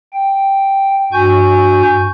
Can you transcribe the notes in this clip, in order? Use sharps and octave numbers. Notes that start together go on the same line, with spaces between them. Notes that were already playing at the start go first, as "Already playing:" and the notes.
G5
G2 F#4 G#5 C#6 G6